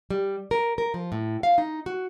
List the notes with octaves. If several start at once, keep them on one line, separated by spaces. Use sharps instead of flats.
G3
A#4
A#4
F3
A2
F5
D#4
F#4